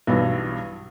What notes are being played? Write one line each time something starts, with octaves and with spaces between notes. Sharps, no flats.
B1 G2 E3